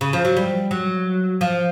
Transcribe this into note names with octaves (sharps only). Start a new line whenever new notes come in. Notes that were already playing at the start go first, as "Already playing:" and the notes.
C#3
F3
F#3
G3
F#3
F3